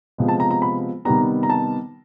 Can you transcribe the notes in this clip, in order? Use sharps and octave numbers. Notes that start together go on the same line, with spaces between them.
C3 F3 G#3 B3
A5
A#5
A#5
B5
C3 D#3 G3 B3 A#5
A#5
A5